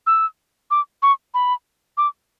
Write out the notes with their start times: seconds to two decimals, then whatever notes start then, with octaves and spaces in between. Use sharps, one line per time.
0.07 E6
0.71 D6
1.02 C#6
1.34 B5
1.97 D6